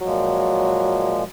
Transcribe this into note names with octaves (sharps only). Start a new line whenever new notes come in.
A#2 F3 F#3 G#3